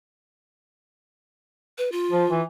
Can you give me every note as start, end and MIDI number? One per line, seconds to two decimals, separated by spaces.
1.78 1.92 71
1.92 2.41 65
2.11 2.25 53
2.30 2.42 52